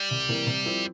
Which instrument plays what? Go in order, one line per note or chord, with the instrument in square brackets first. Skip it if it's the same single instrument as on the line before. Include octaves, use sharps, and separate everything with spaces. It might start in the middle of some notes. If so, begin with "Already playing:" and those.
Already playing: [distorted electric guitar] G3
[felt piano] C2
C3 E3 A#3
C3
F3 C4 E4 A#4